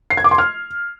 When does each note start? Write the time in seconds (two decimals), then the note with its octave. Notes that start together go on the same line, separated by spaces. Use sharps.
0.10 C7
0.17 G#6
0.24 D6
0.31 C6
0.38 F6